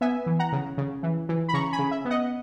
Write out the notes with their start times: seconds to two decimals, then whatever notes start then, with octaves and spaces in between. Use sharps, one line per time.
0.01 B3 E5 G#5
0.26 E3
0.39 F#5 A#5
0.52 C#3
0.78 C#3
1.03 E3
1.29 E3
1.48 B5
1.54 C#3 A#5 C#6
1.72 G#5 B5
1.79 C#3
1.91 E5
2.05 B3
2.10 D#5 F#5